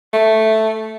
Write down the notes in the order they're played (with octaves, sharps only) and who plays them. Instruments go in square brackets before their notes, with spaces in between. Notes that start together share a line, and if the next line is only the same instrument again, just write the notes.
[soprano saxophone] A3